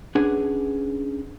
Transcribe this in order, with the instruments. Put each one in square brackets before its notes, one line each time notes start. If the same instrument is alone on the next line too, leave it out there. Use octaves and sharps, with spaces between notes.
[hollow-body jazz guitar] C#4 D4 G#4 B4 F#5 G#5